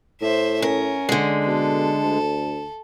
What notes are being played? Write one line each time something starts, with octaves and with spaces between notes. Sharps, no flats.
A2 C5 E5
C#4 A#4
D3 G#3
B2 A4
D2